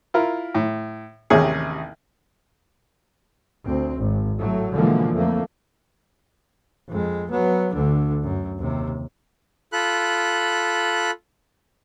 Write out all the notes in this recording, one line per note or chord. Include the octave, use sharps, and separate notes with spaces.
E4 F4 A#4
A2
A1 D#2 C3 C#4 G#4
D2 C4
G#1
A2 F#3 A3
B2 D3 E3 F3 G#3 A#3
F2 A3 A#3
F2 G#3
F#3 B3
D2 D3
F#2
D#2 C3
F4 A4 B5 F#6